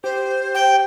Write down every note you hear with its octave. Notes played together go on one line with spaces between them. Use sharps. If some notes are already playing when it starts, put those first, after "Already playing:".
G4 C5
G5